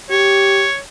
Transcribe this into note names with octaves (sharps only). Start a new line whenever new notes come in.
G4 C#5